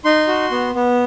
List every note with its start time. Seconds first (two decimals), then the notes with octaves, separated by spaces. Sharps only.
0.04 D#4 C6
0.28 F#4
0.51 B3
0.75 B3